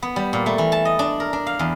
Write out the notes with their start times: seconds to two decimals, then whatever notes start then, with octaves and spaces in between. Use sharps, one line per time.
0.02 B3
0.16 G3
0.33 A#2
0.46 A3
0.58 E3
0.72 A5
0.85 D#5
0.99 D4
1.20 A#4
1.33 D4
1.46 F5
1.59 E2